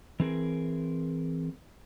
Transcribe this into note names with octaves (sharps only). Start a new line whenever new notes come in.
E3 C4 G#4 A#4